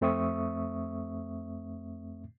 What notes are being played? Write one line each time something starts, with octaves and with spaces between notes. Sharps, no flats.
F2 A3 C4 E5 C#6 D#6